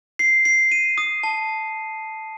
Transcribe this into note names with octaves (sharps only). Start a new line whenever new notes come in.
C7
C7
D#7
D#6
A5